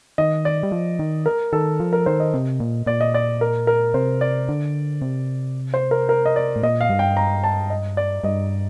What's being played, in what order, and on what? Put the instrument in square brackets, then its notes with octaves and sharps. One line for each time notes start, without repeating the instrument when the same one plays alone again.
[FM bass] D#3 [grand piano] D#5
[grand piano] D5
[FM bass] G3
F3
D#3
[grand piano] A#4
[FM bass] D#3 [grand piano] A4
[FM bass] F3
[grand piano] A#4
[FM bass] D#3 [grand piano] C5
[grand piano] D#5
[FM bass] C3
A#2
[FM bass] A#2 [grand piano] D5
[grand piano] D#5
D5
A#4
A#4
[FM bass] C3 [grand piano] C5
[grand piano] D5
[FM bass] D3
C3
[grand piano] C5
A#4
A#4
D#5
D5
[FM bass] A2
[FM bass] A#2 [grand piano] D#5
[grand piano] F5
[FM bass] G2
[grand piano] G5
A#5
A5
D#5
D5
[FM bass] G2 [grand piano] D#5